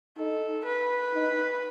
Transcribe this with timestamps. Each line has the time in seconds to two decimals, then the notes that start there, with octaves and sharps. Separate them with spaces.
0.17 D#4 A4
0.65 B4
1.14 D#4